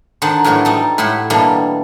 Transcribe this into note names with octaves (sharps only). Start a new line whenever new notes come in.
D3 D#3 D#4 C5 F#5 A5
A2 E3 F#3 F#4 A#4
G3 D#4 A4
A2 E4 E5 F#5 C6
B2 E3 G3 A#3 D4 A4